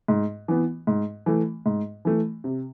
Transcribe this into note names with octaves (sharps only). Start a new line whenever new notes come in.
G#2
E3 B3
G#2
E3 A3
G#2
E3 A3
C3